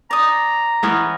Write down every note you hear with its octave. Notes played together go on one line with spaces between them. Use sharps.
D5 A#5 D#6
E3 B3 C#4